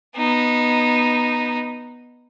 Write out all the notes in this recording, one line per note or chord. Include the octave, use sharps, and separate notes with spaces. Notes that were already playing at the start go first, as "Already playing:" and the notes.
B3 D#4